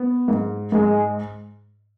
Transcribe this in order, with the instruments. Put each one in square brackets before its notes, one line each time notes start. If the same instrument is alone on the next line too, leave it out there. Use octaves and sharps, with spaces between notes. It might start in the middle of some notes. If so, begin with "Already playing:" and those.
Already playing: [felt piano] B3
G#2
[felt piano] G#2 [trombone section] G#3